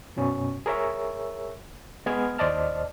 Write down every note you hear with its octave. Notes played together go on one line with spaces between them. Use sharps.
F#2 B2 C#4
G#4 A#4 C#5 E5 E6
G#3 B3 G#4 F6 G#6
D#2 C5 D5 D#5 A5 F6